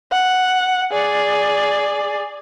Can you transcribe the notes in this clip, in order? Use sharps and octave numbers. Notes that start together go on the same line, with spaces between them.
F#5
G#4 D5